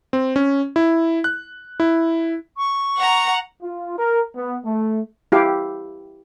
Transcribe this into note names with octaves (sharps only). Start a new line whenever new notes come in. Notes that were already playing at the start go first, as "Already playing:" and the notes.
C4
C#4
E4
F#6
E4
C#6
F#5 A#5
F4
A#4
B3
A3
E4 G4 F5